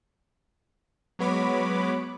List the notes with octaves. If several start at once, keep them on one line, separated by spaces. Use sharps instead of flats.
F#3 G#3 B3 C#5 B5 D6